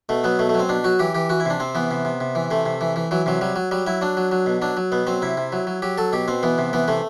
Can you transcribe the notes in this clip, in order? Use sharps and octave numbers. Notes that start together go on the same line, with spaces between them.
B2 A3
F#3 B3
B2 A3
A3
F#3
C4
B2 D4
F#3 F#4
E3 G4
E3 G4
E3 F#4
E4
C3 D4
C3 C4
E3 B3
C3
C3
C3
E3
C3 A3
C3
E3
E3
E3 F#3
C3 F#3
F#3 G3
F#3
F#3 G3
F#3 E4
F#3 D4
F#3
F#3
B2
F#3 D4
F#3
B2 B3
F#3 C4
C3 E4
C3
F#3
F#3
F#3 G4
F#3 A4
B2 G4
B2 C4
E3 B3
C3
E3 B3
C3 A3